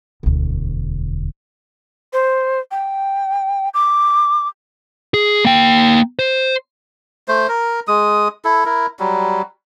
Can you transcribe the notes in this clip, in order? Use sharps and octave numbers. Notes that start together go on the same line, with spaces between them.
E1 D2
C5
G5
D6
G#4
A#3 G5
C5
A3 C5
A#4
G#3 D#6
E4 A4
E4 A#4
F#3 G3